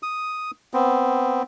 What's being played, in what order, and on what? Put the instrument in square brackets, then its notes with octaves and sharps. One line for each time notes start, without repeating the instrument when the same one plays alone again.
[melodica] D#6
B3 C4